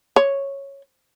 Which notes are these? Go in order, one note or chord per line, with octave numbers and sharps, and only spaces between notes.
C#5